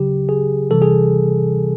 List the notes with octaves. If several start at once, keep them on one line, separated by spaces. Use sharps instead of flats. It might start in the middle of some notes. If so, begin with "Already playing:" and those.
Already playing: C#3 F#3 G4
G#4
C3 E3 G3 A4
G#4